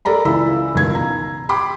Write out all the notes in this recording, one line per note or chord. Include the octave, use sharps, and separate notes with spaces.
A4 A#4 D5 A#5 B5
C#2 E3 D5 B5 E6
E1 C#2 D#3 A#4 G#6
A#5
G5 B5 C6 D6